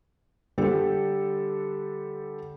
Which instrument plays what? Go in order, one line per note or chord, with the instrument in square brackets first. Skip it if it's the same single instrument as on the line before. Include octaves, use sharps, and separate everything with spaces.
[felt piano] D3 G3 D4 G4 A4